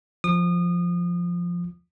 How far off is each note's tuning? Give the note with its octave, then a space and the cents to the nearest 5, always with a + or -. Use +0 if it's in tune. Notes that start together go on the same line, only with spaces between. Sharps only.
F3 +0 D#6 -30